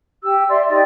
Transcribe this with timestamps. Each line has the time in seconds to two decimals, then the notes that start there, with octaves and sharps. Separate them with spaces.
0.24 G4 E6
0.50 D5 E5 C6
0.69 D#4 G4 D5 D#5